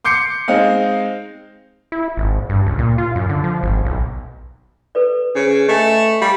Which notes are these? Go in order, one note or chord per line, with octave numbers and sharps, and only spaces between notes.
C6 D6 G6 C7 C#7
G#3 C4 D#4 F5
E4
G#1
G2
C#2
A#2
F4
F#2
D3
F3
G#1
B1
A4 B4 D5
C#3 D4 C5 C#5
A3 D#5 G#5
G3 G4 F5